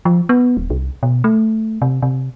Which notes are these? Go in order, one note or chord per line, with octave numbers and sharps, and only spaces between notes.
F3
B3
D#1
C2
B2
A3
C3
C3